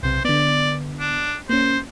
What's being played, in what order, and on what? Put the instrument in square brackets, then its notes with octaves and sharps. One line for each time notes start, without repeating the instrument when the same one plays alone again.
[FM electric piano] B1 C3 [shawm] C5
[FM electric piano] D3 B3 [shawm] D5
[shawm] D4
[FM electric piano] A#3 C#4 [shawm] C5